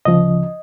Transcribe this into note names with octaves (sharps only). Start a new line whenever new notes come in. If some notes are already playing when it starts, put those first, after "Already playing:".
D2 C#3 F3 D#5